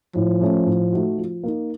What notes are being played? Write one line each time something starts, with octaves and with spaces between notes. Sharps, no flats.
A2 F3
A3 C#4
A2
A3 D#4 F#4
F3
A#3 D#4